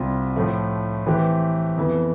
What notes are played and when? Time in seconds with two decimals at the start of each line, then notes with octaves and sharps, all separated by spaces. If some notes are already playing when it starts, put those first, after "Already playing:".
Already playing: C2 C3 G3 C4 F4
0.36 A2 F3 A3
1.06 E3 A3 C4 G4 B4
1.77 F2 E3 B3